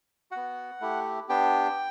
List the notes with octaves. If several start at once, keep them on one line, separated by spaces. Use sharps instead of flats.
B3 F#4 F#5
A3 E4 G4
B3 D4 G4 G5